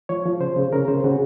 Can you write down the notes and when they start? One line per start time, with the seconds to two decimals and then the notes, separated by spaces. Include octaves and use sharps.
0.09 F3 C#5
0.25 F3
0.40 C#3 C5
0.57 C#3
0.73 C#3 A#4
0.88 C#3 C5
1.04 C#3 F#4